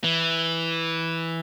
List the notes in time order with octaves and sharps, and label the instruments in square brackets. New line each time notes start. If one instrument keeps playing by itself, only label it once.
[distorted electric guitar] E3